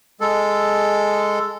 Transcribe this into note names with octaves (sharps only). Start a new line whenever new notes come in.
G#3 A4